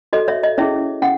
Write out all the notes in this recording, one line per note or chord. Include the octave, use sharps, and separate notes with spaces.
F#4 A4 C#5 D#5
C#5 E5
D#5
C#4 E4 G#4 C#5 E5
C#4 F#5